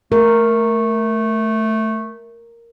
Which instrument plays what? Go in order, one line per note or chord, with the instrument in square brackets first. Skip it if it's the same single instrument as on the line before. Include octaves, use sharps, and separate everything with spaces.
[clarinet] A3 [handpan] A#4